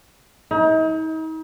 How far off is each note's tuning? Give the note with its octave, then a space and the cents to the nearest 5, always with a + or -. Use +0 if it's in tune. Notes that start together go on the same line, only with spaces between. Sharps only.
D#4 +40